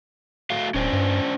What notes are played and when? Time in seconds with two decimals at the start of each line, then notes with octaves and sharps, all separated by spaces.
0.50 A3 F#4 F5
0.74 D1 C#4 D4 C5
0.93 G2